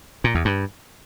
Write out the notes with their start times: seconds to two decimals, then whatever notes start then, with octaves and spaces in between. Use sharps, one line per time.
0.24 A#2
0.35 E2
0.45 G2